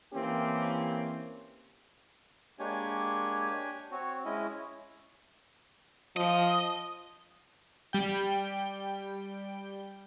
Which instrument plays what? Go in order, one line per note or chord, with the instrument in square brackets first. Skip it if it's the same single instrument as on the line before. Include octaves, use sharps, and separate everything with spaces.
[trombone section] E3 A#3 C4 C#4 G4
[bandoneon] G#3 A#3 C#5 [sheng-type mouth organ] D4 G4 G#5
[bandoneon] C4 F#4 [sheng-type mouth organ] C#5
[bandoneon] G#3 C#4 E4 [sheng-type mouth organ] D#5
[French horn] F3 [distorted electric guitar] D#5
[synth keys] G3 G5